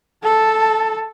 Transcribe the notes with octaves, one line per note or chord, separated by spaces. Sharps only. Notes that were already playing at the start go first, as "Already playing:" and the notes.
A4 A5